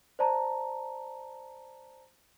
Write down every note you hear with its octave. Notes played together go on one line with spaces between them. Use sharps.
C5 D5 A5 A#5